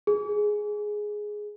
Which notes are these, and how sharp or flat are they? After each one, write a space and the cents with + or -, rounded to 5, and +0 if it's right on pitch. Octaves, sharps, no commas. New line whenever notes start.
G#4 +5